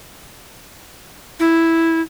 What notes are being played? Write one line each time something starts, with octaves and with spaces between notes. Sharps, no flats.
E4